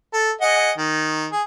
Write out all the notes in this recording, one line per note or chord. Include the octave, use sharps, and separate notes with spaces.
A4
G#4 D#5 F#5
D#3
G#4